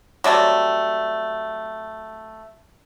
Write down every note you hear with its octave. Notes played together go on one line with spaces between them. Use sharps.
F#3 G3 A3 C4